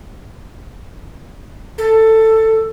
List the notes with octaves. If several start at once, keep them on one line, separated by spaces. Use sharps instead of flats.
A4